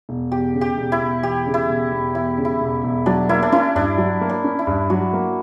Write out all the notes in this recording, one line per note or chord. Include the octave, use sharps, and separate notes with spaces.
E1
E2 G4
C#3
G4
E1
E4
E1
E2 G4
C#3
E4
E1
E1
E2 E4
C#3
E4
E1
E1
F#3 D4
A#3 E4
D4
C#4 E4
G2 D4
F#3
A#3
D4
C#4
E4
G2
F#3 F#4
A#3